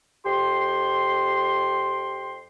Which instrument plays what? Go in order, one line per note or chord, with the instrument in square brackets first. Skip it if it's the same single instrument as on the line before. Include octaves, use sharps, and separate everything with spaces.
[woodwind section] F2 G4 G5 C6